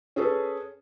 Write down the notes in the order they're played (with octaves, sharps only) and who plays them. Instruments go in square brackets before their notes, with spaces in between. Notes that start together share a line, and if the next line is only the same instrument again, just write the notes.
[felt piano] C#4 G#4 A4 B4